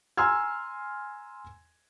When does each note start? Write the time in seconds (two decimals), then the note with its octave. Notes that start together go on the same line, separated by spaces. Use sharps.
0.17 G#5 A#5 C6 E6 F6 G#6